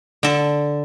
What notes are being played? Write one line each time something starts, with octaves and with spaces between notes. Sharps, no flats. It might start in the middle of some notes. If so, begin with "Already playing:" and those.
D3 A4